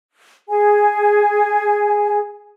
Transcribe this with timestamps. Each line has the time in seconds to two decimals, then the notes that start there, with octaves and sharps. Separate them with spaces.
0.50 G#4 G#5